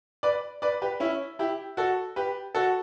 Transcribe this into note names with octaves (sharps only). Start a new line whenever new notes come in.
B4 D5
B4 D5
G4 B4
C#4 E4
E4 G4
F#4 A4
G4 B4
F#4 A4